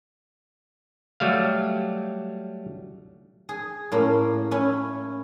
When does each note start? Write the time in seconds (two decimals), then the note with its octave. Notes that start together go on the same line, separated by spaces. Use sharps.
1.20 F#3 G3 A3 F5
3.49 G#4
3.92 A2 A#3 C#4
4.51 C#4 E4